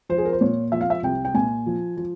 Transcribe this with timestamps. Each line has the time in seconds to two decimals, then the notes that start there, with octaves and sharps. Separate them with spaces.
0.09 F3 C5
0.18 G#4
0.25 A#4
0.33 C5
0.41 A#2 C#5
0.72 F3 E5
0.81 F5
0.90 E5
1.03 C2 G5
1.25 G5
1.34 A#2 G#5
1.66 F3
1.97 F3